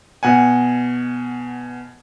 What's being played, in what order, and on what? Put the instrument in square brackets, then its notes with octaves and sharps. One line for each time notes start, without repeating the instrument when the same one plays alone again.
[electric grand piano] B2 F#5 G#5